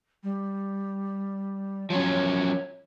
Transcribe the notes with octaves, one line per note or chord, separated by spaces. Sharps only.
G3
F3 F#3 C#4 C#5